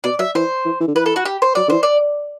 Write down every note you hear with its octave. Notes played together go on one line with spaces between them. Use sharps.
B2 D5
F#3 E5
E3 C5
E3
E3
D3
E3 B4
A4
F#4
G4
C5
F#3 D5
D3 E3 C5
D5